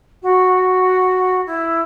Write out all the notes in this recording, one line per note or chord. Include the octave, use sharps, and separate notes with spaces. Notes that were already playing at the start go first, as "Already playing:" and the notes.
F#4
E4